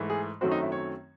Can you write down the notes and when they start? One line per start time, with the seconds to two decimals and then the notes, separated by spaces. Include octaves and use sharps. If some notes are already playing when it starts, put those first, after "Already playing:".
Already playing: G#2 E3 A3
0.10 G#4
0.41 F#2 D#3 F#3 A3 C4 F#4
0.52 D#4
0.62 E4
0.72 C#5